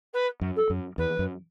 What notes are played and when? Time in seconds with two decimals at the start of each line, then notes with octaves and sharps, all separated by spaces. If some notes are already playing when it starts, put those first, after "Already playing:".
0.13 B4
0.41 F#2
0.56 A4
0.70 F#2
0.98 E2 B4
1.19 F#2